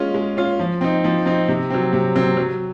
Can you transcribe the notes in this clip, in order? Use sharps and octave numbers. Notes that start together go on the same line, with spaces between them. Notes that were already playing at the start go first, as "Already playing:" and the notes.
Already playing: G#3 C#4 F4
G#3
C#4 F4
F3
C4 D#4
F3
C4 D#4
C3
F#3 C4
C3
F#3 C4
F#3